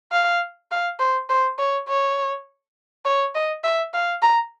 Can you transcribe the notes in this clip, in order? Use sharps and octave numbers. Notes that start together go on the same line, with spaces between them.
F5
F5
C5
C5
C#5
C#5
C#5
D#5
E5
F5
A#5